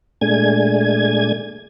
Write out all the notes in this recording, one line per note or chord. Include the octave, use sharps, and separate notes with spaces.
A#2 G#3 A3 D4 G#5 G#6